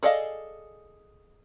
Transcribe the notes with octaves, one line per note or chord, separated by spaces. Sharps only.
G#4 A4 D5 D#5 F5